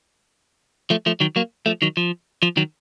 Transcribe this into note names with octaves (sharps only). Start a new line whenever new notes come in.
F3 A3
F3 A3
D#3 F#3
F#3 A#3
F3 A3
D#3 F#3
F3
F3
D#3 F#3